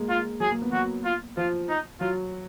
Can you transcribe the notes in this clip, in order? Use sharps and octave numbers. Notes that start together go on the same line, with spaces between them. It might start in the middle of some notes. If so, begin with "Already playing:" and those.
Already playing: G#3 A#3
F4
F#3 G#4
A#3
B3
F#3 F#4
F4
F3 F4
D#4
F#3 F4